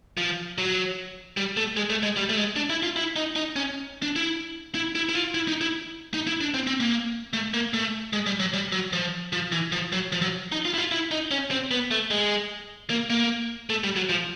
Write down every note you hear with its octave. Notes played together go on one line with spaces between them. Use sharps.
F3
F#3
G3
A3
G#3
A3
G#3
G3
A3
G#3
D4
E4
F4
E4
D#4
D#4
C#4
D4
E4
E4
E4
E4
F4
E4
D#4
E4
D#4
E4
D4
C4
C4
A#3
A3
A#3
A3
G#3
G3
F#3
G3
F#3
F3
F3
E3
F3
F#3
F3
F#3
D#4
F4
E4
F4
E4
D#4
C#4
C4
B3
A3
G#3
A#3
A#3
A3
G3
F#3
F3